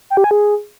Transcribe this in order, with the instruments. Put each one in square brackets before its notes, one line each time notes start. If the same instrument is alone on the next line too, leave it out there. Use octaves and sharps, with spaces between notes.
[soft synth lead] G5
G4
G#5
G#4